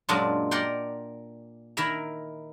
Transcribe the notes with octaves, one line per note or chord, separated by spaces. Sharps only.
F#2 A#2 F#3 G#3 D4 F4
A#4 D5 F#5 G5 C6
D#3 E4 A#4 E5 A#5